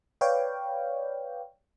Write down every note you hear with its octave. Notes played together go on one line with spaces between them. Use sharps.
B4 C#5 D5 F5 G5